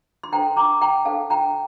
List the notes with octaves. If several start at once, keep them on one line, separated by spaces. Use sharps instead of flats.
C6
D4 A4 C5 G5 A#5
A#5 D6
G5 A#5
D4 A4 C5 F5 A5
G5 A#5